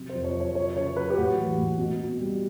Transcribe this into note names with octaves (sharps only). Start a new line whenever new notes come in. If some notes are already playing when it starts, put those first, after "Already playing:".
Already playing: C3 F#3
C5
F2
C#5
F2
C#5
F#3 C#5
C#3 C#5
F#3 B4
G4
A2 F#4
E3
A2
B2
B2
G3